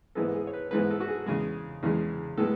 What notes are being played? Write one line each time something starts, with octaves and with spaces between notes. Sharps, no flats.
G#2 E3 G#3 B3 A4
G#4
C#5
B4
G#2 E3 G#3 B3 B4
A4
F#4
G#4
E2 C#3 G#3 G#4
E2 C#3 G#3
A2 G#3 B3 A4